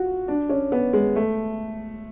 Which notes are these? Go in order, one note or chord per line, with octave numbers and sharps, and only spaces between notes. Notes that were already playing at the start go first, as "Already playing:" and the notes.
Already playing: F4 F#4
D4
C#4
B3
G#3
A3